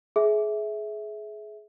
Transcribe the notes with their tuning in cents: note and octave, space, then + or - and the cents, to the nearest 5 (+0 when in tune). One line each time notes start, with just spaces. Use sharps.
G#4 +25 E5 -10